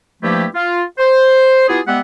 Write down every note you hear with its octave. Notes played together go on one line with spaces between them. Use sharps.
G2 F3 A3 A#3 E4 G4
F4
C5
B3 E4 F4 G4 G#4
G3 G#3 B3 G4 E5 F#5